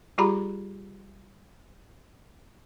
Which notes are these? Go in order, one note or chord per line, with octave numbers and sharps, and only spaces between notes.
G3 F4 G4 G#4 A#5 B5